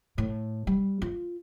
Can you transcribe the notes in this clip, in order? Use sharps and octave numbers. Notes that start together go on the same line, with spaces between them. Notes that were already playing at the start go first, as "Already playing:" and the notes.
A2
G3
F4